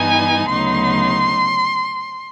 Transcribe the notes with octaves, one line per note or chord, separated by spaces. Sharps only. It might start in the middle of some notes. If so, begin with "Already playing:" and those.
Already playing: G2 E3 G3 B3 D#4 G#5
D2 C#3 F#3 B3 D#4 C6